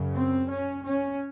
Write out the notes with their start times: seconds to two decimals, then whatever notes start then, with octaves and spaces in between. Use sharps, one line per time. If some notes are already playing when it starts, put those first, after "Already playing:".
Already playing: F#2 C#3
0.14 C4
0.50 C#4
0.84 C#4